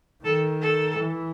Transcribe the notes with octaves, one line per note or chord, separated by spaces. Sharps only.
D#3 A4
A4
E3